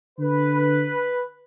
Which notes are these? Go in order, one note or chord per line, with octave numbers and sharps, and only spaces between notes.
D3 B4